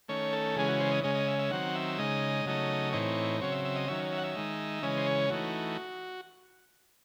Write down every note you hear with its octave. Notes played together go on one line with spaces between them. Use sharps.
D#3 A3 C#4 C#5
A4
C#3 E3 G#3 C#4 G#4
F#4
C5
D#5
C#3 G#3 C#4 D#5
D#5
E5
E5
D#3 F#3 C4 F#5
E5
C#3 G#3 D#4 D#5
C#3 F#3 A3 D#4
A2 E3 C4 D#4 C#5
C#3 F#3 C4 C#5
E5
E5
D#5
D#3 F#3 C#4 E5
E5
F#5
E5
D#3 G#3 D#4
C#3 E3 G#3 C#4 D#5
C5
C#5
E3 A3 D#4 F#4